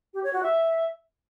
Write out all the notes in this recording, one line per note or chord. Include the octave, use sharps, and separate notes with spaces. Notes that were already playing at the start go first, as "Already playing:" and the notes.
G4
C#5
F#4
E5